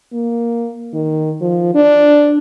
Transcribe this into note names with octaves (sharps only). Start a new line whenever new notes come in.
A#3
D#3
F3
D4